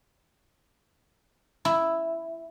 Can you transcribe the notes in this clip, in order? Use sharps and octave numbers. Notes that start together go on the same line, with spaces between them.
E4